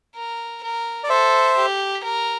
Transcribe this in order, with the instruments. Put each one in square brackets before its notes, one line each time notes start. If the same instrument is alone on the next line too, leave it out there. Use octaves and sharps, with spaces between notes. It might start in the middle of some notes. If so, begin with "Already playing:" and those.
[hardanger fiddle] A#4
A#4
[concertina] D5
[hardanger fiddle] A4 [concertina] C5 E5
[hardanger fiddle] G4
A#4